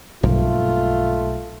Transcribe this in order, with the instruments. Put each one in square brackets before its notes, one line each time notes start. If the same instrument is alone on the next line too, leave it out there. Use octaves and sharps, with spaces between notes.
[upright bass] B1 [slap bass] G2 F3 A#3 [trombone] A3 [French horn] F4